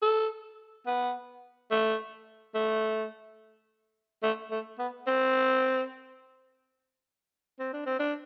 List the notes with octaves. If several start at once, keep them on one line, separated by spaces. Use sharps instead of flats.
A4
B3
A3
A3
A3
A3
B3
C4
C4
D4
C4
D4